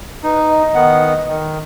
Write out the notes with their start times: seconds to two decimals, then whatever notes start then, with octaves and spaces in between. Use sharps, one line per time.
0.24 D#4 B4
0.49 D#5
0.75 D#3 B3 F#5
1.28 D#3